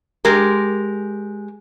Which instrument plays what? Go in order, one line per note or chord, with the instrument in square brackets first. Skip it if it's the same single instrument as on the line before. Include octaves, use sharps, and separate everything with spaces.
[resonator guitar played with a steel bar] G#3 G4 A#4